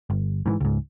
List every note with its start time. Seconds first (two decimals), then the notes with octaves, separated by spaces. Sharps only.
0.10 G1
0.46 G#2 D#3 E3
0.61 C#2 G#2